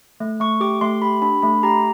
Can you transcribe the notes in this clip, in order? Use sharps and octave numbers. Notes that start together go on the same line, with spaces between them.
A3
A3 C#6
G4 D6
A3 C6
G4 B5
D4 B5
A3 B5
G4 A#5